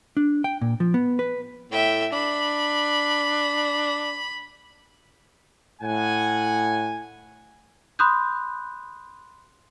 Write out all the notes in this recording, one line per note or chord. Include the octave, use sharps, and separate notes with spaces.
D4
G5
A#2
F3
B3
B4
A2 E5 G5
D4 B5
A2 F#5 G#5
B5 C6 D#6 F#6 G6